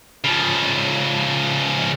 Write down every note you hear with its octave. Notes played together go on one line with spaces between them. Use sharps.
C#3 F3